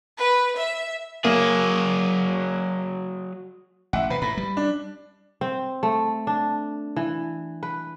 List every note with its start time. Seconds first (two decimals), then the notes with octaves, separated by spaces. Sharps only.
0.17 B4
0.57 E5
1.25 F#3 A#3 G#4
3.93 A1 E5 F#5
4.10 B2 B4
4.22 A2 B5
4.37 G3
4.57 D4
5.41 C4
5.83 A3
6.27 D4
6.96 E3
7.63 B4